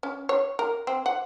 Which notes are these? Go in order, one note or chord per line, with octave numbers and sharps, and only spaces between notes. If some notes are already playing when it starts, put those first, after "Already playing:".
C#4
C#5
A#4
C4
F#5